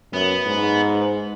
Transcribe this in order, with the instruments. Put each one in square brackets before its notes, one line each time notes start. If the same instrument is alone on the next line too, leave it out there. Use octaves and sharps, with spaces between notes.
[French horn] F#2 [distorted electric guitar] B3
[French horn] G#2